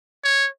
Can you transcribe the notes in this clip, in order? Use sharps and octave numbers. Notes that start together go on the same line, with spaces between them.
C#5